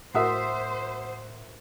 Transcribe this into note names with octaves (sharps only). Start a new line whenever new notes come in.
A2 F#4 A#4 C5 E5 F#5 D#6 E6